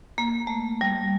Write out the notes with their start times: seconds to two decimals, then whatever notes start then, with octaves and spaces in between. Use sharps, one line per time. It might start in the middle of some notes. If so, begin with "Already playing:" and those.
0.18 A#3
0.47 A3
0.81 G3